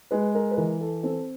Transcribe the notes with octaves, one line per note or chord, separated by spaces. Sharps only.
G#3 B4
A#4
B4
E3 A#4
A4
C4 A4